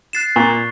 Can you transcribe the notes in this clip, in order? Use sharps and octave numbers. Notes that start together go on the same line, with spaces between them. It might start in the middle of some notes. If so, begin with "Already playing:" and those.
F#6 A6 C7 E7
A#2 C#6